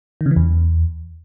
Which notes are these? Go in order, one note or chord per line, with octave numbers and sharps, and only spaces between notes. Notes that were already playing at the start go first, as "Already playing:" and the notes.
D#3
C#3
E3
E2